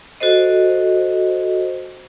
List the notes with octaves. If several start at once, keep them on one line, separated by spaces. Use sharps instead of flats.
F#4 A4 C5 D#5